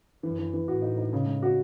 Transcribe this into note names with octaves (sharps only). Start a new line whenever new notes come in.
F#2 E3
E3
E3
A2 F#4
D#4
D#4
C#3
G#3
F#4